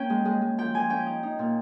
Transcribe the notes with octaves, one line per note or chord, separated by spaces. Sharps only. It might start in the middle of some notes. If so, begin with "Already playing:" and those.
Already playing: A#3 C#4 G5
G#3
G#3
G#3
F3 G5
F3 G#5
C#4 G5
D#4
D#4
A#2